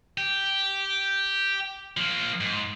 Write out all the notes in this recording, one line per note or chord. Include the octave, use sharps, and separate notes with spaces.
G4
F3 A#3
G#2